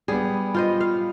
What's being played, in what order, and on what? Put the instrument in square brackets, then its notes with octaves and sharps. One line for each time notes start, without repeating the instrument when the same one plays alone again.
[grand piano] G3 B3 [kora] G#4
[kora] F4 C5 D#5
F5